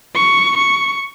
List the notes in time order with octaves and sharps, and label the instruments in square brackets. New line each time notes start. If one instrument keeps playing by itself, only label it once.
[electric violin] C#6
C#6